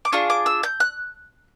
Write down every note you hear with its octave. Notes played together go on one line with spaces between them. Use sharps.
D6
D4 F4 G#4 C#6
D6
E6
G6
F#6